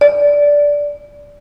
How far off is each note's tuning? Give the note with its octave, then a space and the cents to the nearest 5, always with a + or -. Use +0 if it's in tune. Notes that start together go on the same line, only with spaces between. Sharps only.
D5 -10